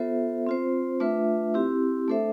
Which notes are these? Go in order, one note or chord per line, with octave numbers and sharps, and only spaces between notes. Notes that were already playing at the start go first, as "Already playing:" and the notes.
Already playing: B3 F4 A4 C5 E5
C4 F4 C5
A3 D4 F4 B4 E5
C4 E4 G4
A3 D4 A4 C5 E5